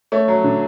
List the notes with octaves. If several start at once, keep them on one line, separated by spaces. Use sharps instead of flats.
A3 C#5
F#3
D3